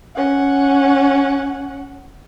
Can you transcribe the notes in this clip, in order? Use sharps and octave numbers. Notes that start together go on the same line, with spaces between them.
C#4 F#5